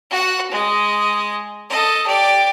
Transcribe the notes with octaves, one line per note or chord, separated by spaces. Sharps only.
F#4 F#5
G#3 D#5
A4 D#5
G4 D5